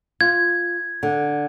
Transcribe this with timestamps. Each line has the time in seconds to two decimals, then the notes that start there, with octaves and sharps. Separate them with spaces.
0.21 F4 G#6
1.03 D3